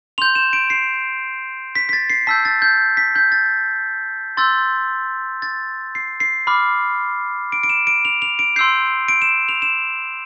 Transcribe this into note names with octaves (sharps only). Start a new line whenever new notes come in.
C6 G6 F7
E7
D7
C7
B6
B6
A6
C7
A5 E6 G6 B6
A6
G6
B6
G6
A6
C6 E6 G6 A6
A6
C7
C7
B5 D6 F6
D7
D7
E7
D7
F7
F7
D7
C6 E6 G6 C7
D7
E7
F7
E7